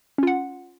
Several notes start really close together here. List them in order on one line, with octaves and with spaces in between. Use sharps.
C#4 F4 F#5